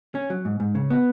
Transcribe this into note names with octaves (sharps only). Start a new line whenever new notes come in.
C#4
F#3
G#2
G#2
C#3
B3